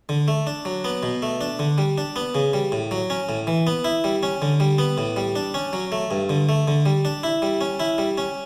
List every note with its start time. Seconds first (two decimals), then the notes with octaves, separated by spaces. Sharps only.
0.09 D3
0.28 A3
0.47 D4
0.65 F#3
0.84 B3
1.03 B2
1.22 A3
1.41 D4
1.59 D3
1.78 G3
1.98 D4
2.16 B3
2.35 C#3
2.53 G3
2.72 A2
2.91 F#3
3.10 C#4
3.29 A2
3.47 E3
3.67 B3
3.84 E4
4.04 G3
4.23 C#4
4.42 D3
4.60 G3
4.78 B3
4.98 A2
5.16 G3
5.36 D4
5.54 C#4
5.73 F#3
5.92 A3
6.11 G2
6.29 D3
6.49 A3
6.68 D3
6.86 G3
7.05 D4
7.23 E4
7.42 G3
7.61 C#4
7.80 E4
7.98 G3
8.18 C#4